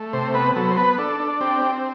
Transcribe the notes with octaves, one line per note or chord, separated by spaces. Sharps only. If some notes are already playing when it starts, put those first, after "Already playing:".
Already playing: A3
C3 C5
B3 B4
F#3 A4
C5
B3 B4
D4 A4
D4
C4 G4
C4